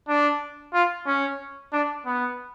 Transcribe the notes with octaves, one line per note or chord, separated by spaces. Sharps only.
D4
F4
C#4
D4
B3